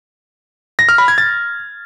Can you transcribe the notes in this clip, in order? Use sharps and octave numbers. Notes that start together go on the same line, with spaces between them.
A#6
F6
B5
G#6
A6